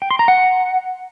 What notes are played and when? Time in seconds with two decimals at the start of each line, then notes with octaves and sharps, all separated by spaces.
0.02 G5
0.11 C6
0.19 A#5
0.28 F#5